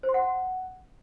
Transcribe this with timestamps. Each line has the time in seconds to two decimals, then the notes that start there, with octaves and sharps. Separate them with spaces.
0.03 C5
0.09 C6
0.14 F#5